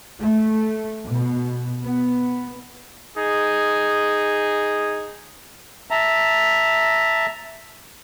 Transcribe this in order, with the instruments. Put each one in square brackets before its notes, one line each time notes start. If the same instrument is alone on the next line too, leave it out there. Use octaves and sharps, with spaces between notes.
[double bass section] A3
B2
B3
[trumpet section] D#4 G#4
[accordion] E5 A5 A#5